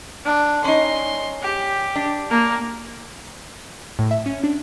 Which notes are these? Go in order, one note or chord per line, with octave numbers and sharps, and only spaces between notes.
D4
C#4 D#4 C6
G4
D4
A#3
A2
E5
C#4
D4